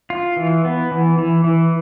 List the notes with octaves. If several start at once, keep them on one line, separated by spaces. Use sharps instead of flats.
F4
E3
B3
E3
E3
E3